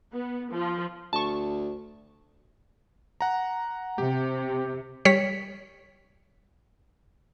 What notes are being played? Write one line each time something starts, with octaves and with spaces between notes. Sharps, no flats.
B3
F3
D2 A5 C#6
F#5 A#5
C3 G4
G3 C#5 B6